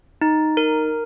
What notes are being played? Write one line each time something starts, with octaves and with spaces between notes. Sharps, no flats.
D#4
A#4